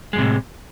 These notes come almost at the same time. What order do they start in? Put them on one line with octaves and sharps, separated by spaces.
G#3 F#2 C3 A2